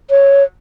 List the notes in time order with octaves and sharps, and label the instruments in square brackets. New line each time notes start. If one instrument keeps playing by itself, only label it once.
[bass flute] C#5